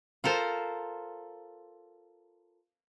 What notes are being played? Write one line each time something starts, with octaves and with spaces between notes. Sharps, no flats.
F4 A4 A#4 C5